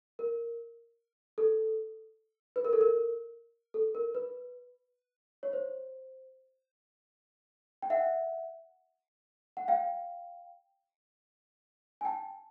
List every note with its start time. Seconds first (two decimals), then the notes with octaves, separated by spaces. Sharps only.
0.19 A#4
1.38 A4
2.56 B4
2.65 A#4
2.73 A4
2.81 A#4
3.74 A4
3.95 A#4
4.15 B4
5.43 C#5
5.53 C5
7.82 G5
7.90 E5 F#5
9.57 F#5
9.68 F5 G5
12.01 G#5
12.05 G5 A5